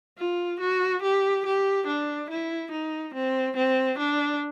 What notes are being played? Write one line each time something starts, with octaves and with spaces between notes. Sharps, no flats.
F4
F#4
G4
G4
D4
E4
D#4
C4
C4
D4